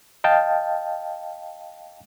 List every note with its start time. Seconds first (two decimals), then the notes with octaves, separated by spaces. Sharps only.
0.24 D#5 F5 G5 A5